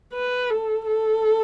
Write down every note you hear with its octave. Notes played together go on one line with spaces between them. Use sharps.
B4
A4
A4